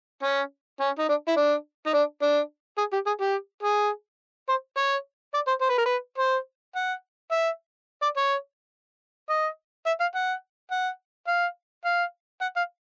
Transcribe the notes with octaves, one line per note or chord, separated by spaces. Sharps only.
C#4
C#4
D#4
D4
E4
D4
D#4
D4
D4
G#4
G4
G#4
G4
G#4
C5
C#5
D5
C5
C5
B4
A#4
B4
C5
F#5
E5
D5
C#5
D#5
E5
F5
F#5
F#5
F5
F5
F#5
F5